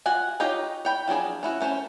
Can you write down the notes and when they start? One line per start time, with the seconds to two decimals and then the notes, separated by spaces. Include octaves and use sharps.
0.06 F4 F#4 F#5 G#5
0.40 D#4 F4 G4 C#5 D#5
0.85 C#5 G5 B5
1.08 F3 F#3 D4 G#4
1.43 C#4 E4 F#4
1.61 A3 C#4 C5 A5